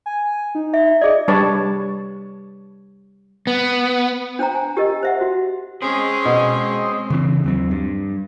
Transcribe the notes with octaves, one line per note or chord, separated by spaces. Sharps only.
G#5
D#4
E5
G#4 D5 D#5
G3 D4 B4 C#5 D5 A5
B3
D4 C5 G5 A#5
G#5
G4 A#4 D#5
C5 E5 F#5
F#4
G#3 C4 C#4 G#4
B2
C#3 E3 C4
D#2 F#3 C4
G2